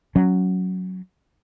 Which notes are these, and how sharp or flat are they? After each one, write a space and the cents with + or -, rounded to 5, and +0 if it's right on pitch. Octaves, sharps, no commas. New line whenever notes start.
F#3 +0 C#4 +0